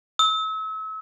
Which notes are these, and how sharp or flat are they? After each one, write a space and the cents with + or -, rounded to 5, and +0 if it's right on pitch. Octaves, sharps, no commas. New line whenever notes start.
E6 -35